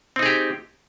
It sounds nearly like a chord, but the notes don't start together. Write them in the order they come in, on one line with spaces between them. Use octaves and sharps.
C4 D#4 G#4 G4